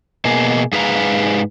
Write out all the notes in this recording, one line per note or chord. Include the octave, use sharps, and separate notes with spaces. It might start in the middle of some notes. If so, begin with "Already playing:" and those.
B2 A#3 G#4
G#2 G#4 B4 F5 A#5